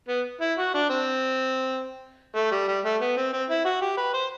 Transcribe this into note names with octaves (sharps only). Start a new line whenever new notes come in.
B3
E4
F#4
D4
C4
A3
G3
G3
A3
B3
C4
C4
E4
F#4
G4
B4
C5